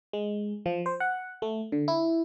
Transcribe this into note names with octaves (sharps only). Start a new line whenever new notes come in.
G#3
F3
C5
F#5
A3
D3
E4